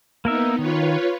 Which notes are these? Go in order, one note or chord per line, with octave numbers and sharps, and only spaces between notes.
A#3 B3 D#4 A#4 E5
D#3 F4 B4 C#5